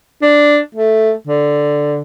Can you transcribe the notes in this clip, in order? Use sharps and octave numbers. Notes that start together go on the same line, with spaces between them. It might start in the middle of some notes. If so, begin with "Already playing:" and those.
D4
A3
D3